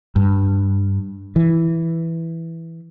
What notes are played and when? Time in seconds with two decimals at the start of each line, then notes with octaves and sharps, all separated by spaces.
0.16 G2
1.36 E3